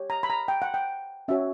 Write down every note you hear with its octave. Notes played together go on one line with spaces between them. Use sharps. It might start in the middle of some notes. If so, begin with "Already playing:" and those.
Already playing: G4 C#5
A#5
B5
A#5
G5
F#5
G5
C#4 F#4 C#5 E5